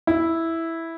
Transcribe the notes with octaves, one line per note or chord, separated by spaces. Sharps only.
E4